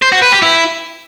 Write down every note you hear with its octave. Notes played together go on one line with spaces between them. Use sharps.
C5
F#4
B4
G4
E4